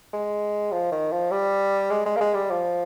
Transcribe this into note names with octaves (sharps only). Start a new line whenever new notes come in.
G#3
F3
D#3
F3
G3
G#3
G#3
A#3
G#3
G3
F3